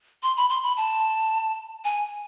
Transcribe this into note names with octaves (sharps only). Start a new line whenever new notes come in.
C6
B5
C6
B5
A5
G#5